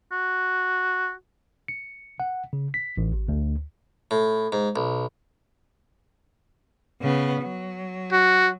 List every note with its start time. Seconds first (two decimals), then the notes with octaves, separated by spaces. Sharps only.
0.12 F#4
1.68 C#7
2.20 F#5
2.53 C#3
2.74 B6
2.97 A1
3.13 G#1
3.28 D2
4.11 A2
4.52 G#2
4.76 B1
7.01 C#3 B3
7.42 F#3
8.12 F#4